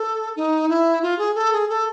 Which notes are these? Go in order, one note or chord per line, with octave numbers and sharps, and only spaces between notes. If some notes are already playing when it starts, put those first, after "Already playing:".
Already playing: A4
D#4
E4
F4
G#4
A4
G#4
A4